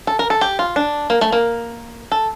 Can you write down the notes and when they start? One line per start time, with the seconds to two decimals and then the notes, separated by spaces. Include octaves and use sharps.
0.07 A4
0.19 A#4
0.30 A4
0.41 G4
0.59 F4
0.76 D4
1.10 A#3
1.21 A3
1.32 A#3
2.12 A4